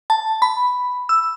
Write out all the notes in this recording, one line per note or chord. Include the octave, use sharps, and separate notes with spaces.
A5
B5
E6